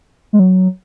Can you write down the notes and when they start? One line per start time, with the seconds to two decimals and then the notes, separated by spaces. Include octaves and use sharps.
0.33 G#3
0.39 F#3